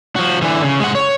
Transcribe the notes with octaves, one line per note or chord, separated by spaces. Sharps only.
F3 F#4
D3 E3
C#3
G#3 F#5
C#5